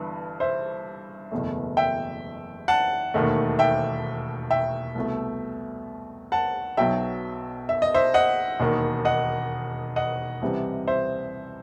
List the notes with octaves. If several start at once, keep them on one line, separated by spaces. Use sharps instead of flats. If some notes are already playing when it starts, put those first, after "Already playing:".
Already playing: G1 G2 E3
C5 E5
F#1 E2 B2 A3
E5 G5
F#5 A5
E1 D#2 D#3 A3
E5 G5
E5 G5
C2 B2 A3
F#5 A5
B1 B2 F#3 E5 G5
E5
D#5
C5 E5
D#5 F#5
E1 D#2 D#3
D#5 F#5
D#5 F#5
C2 C3 E3 G3
C5 E5